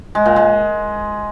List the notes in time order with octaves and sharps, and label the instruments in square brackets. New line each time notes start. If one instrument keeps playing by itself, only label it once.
[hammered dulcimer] G#3
A#2
G#3